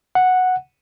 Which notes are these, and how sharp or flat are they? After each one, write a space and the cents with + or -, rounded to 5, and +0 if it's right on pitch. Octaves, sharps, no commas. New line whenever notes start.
F#5 -5